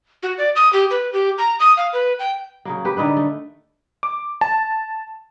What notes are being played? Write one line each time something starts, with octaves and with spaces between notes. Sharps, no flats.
F#4
D5
D#6
G4
B4
G4
A#5
D#6
F5
B4
G5
C#3 F#3 A#3
G4 B4
D3 D#3 D#4 B4
A3
D6
A5